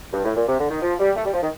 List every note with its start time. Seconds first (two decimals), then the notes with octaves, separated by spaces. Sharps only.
0.13 G2
0.25 A2
0.37 A#2
0.48 C3
0.59 D3
0.71 D#3
0.82 F3
0.99 G3
1.17 A3
1.25 G3
1.34 F3
1.43 D#3